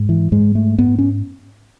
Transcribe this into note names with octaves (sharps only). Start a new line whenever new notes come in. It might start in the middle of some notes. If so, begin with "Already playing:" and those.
Already playing: G#2
E3
G#2 G#3
A3
G#2 B3
C#4